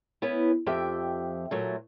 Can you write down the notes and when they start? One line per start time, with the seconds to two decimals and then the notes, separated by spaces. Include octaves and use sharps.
0.22 B3 C#4 E4 B4
0.66 F2 F3 G4 E5 G5
1.51 A#2 F#3 A3